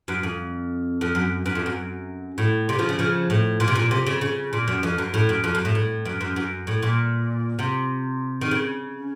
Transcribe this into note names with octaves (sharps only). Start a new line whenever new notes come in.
F#2
F2
F2
F#2
F#2
F2
F#2
A2
C3
C#3 F3
C#3
C#3 F3
A2
A#2
C3
A#2
C3
C#3
C#3
A#2
F#2
F2
F#2
A2
F#2
F2
F#2
A2
A2
F#2
F#2
F#2
A2
A#2
C3
D#3
C#3